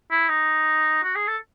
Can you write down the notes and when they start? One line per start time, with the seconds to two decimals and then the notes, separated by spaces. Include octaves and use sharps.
0.11 E4
0.29 D#4
1.03 F#4
1.15 G#4
1.28 A4